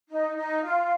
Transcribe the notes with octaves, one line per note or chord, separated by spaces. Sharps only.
D#4
D#4
F4